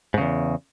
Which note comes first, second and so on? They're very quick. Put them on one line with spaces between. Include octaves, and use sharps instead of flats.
G#2 C#3 E2